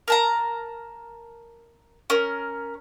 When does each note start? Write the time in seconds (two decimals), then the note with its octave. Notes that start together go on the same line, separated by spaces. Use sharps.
0.08 A#4 A5 A#5
2.10 C#4 A#4